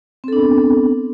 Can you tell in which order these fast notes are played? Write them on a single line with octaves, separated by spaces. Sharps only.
C4 A4 D4 B3